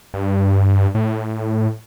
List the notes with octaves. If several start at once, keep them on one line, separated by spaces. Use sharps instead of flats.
G2
A2